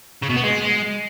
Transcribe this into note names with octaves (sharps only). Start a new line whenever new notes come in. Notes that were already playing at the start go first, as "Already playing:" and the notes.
C#3
B2
B3
G#3